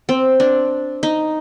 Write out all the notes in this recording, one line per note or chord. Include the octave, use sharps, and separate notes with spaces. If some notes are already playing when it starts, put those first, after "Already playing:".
C4
D4
D#4